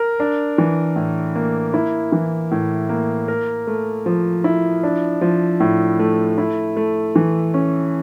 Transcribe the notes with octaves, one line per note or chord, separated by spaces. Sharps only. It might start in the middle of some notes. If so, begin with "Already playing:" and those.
Already playing: A#4
D4
E3
A2
A#3
E4
E3
A2
A#3
A#4
A3
F3
E4
D4
F3
A2
A3
E4
A3
E3
C#4